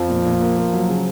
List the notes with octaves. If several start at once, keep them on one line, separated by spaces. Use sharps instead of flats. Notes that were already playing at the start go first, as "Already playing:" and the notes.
Already playing: F2 F3
A#2
A#2
A#3
A#3
F#3
C#3